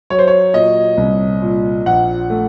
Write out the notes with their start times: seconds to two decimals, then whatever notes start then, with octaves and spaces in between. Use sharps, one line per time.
0.10 F#3 C#5
0.19 C5
0.28 C#5
0.54 A#2 D#5
0.97 C2
1.42 A#2
1.86 A#1 F#5
2.30 A3